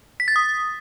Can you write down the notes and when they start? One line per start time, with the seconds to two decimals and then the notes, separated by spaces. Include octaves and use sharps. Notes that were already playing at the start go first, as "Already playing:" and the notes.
0.20 B6
0.28 A6
0.36 D#6